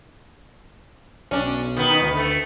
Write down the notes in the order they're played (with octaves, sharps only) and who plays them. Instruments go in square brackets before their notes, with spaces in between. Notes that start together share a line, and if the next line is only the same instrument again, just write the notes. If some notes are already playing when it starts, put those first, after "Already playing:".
[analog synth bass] B1 [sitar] C#4 D4
[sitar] D#3 B3
[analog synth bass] D#4
D2
[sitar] A3